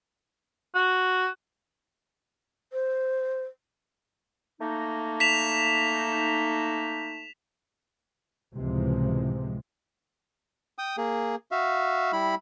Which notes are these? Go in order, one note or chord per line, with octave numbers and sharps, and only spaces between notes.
F#4
C5
A3 A#3 D#4
B6 E7 F7
C#2 A2 C3 E3 F3 G#3
G5 D#6
A#3 G#4
F#4 E5 F5
G3 E4 B5